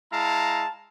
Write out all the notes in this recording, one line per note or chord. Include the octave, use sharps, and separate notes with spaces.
G#3 E4 F5 A5 A#5